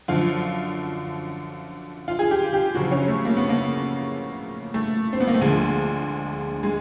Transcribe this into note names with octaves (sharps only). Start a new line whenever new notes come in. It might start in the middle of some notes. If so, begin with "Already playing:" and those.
F#2 D3 F3 F4
F4
G#4
G4
G4
F#2 C#3 F3 F#4
C#4
A3
A#3
B3
A#3
A3
C4
B3
A#3
A3
D2 D3 F3 G#3
G#3